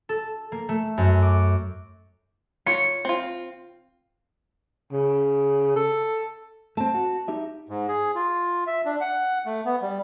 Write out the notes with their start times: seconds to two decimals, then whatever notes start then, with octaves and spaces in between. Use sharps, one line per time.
0.09 A4
0.52 A#3
0.69 A3
0.98 F#2
1.23 D6
2.66 F4 C#5 C#7
3.05 C4 F4
4.92 C#3
5.76 A4
6.77 A3 C4 A5
6.94 F#4
7.28 D#4 G4 E5
7.69 G#2
7.88 G#4
8.15 F4
8.67 E5
8.85 D4
9.01 F#5
9.46 A3
9.65 B3
9.82 G3